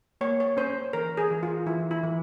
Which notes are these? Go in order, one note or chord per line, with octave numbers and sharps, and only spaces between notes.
A#3 C#5
C#5
C#4 C5
E3 A#4
G#4
E3
F4
E3 E4
E4
E3